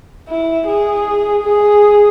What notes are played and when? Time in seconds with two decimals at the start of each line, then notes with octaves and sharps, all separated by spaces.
0.28 E4
0.67 G#4
1.44 G#4